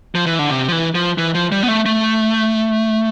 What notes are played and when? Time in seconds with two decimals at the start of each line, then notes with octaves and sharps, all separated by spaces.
0.15 F3
0.26 E3
0.39 D3
0.50 C3
0.68 F3
0.72 E3
0.95 F3
1.18 E3
1.34 F3
1.52 G3
1.63 B3
1.68 A3
1.86 A3